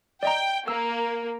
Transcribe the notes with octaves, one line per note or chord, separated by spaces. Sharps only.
D5 D#5 G5 A#5
A#3 E6